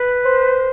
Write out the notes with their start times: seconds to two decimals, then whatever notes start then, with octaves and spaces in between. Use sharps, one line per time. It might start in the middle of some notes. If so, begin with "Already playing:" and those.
Already playing: B4
0.25 C5